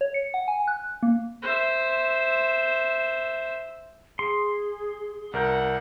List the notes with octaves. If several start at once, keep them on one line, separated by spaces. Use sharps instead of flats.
C#5
C#7
F#5
G#5
F#6
A#3
C5 E5
G#4 C6
C2 A#4 F#5 G6